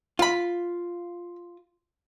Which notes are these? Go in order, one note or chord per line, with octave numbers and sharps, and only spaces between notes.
F4 F5 B5